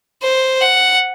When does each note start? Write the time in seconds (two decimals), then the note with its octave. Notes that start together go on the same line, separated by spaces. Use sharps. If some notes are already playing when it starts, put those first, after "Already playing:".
0.22 C5
0.61 F#5